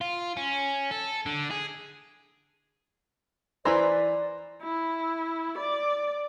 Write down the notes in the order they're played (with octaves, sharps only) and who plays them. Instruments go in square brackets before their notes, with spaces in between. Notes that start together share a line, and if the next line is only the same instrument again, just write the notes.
[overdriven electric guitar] F4
C#4
A4
D3
G#4
[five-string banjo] E3 E4 B4 [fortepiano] C5 A#5 C6 [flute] D5
[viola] E4
D5